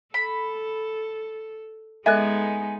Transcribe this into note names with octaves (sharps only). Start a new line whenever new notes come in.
A4 B5
G#3 B3 D#4 A4 D#5 E5 G#5 F#6